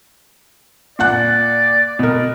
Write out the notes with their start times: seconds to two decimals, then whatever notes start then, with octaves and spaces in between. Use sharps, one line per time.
0.99 A#2 D5 F#5 F#6
1.99 B2 A#4